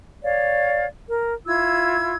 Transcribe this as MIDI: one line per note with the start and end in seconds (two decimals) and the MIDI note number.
0.23 0.85 73
0.23 0.85 74
0.23 0.85 77
1.07 1.34 70
1.46 2.16 64
1.46 2.16 65
1.46 2.16 88
1.46 2.16 92